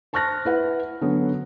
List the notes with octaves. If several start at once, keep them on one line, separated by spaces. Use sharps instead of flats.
C5 A5 C#6 F6 F#6 A#6
E4 B4 F#5
D3 F#3 B3 C#4